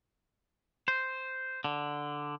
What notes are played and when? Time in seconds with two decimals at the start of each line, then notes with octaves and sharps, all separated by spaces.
0.88 C5
1.64 D3